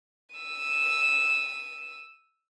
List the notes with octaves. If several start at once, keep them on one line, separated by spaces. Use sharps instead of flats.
E6 D#7